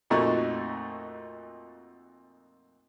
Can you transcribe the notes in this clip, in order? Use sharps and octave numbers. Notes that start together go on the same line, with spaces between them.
F2 A#2 A3 D#4 F#4